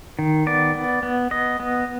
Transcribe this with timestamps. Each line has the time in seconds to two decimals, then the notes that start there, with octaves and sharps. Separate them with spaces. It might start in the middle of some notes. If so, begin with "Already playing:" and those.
0.19 D#3
0.46 B3 D5
0.75 B3
1.03 B3
1.31 B3 D#5
1.60 B3